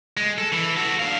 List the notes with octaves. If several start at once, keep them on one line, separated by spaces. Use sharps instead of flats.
G#3
A4
E3
F#4 A4
D4 F5